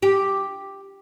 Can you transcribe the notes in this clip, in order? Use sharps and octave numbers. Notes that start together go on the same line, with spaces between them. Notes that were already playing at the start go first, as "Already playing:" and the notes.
G4